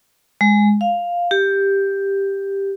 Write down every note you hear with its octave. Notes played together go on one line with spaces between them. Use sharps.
G#3
F5
G4